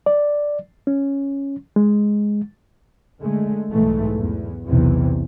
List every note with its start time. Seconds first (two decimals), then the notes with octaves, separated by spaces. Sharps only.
0.06 D5
0.87 C#4
1.76 G#3
3.22 D3 G#3 A3
3.70 B1 G#2 E3 A3
4.18 E2
4.66 B1 E2 C3 E3